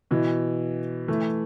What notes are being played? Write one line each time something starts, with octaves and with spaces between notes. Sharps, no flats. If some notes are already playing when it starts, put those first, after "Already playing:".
B2 E3
E3 A3